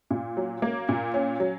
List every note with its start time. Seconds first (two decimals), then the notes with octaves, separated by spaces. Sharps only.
0.11 A#2
0.37 F#3
0.62 A#3
0.89 A#2
1.14 C#4
1.40 F#3